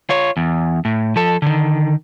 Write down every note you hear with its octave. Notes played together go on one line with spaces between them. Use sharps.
F4 C#5
E2
A2
F3 A4
D3 D#3